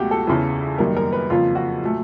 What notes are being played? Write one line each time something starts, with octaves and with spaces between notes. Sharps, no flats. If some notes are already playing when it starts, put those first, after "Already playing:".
Already playing: C#2 B2 F#3 A3 F#4 G4
A4
E2 C#3 E3
F#2 D#3 G3 A#3 A#4
A#4
B4
F2 C#3 F3 A#3 F4
F#4
A#2 F#3 A3